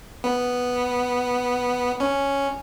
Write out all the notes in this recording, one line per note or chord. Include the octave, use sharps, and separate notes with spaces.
B3
C#4